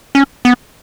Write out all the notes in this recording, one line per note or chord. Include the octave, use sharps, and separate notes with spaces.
C#4
B3